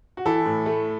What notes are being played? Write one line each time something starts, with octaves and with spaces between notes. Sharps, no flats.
F#4
E3 E4 A4
A2
A3